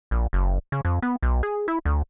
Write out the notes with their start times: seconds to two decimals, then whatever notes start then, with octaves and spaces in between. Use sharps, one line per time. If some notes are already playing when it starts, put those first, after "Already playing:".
0.11 A#1
0.33 F#1
0.72 C#3
0.85 F2
1.02 B3
1.23 B1
1.43 G#4
1.68 E4
1.85 D2